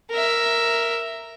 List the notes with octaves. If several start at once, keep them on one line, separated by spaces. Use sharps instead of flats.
A#4 E5